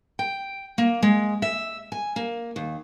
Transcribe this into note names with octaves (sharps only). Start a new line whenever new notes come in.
G5
A#3
G#3
E5
G#5
A#3
D#2